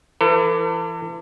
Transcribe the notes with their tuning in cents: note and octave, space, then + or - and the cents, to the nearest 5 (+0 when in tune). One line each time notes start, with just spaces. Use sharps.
E3 +30 A4 +40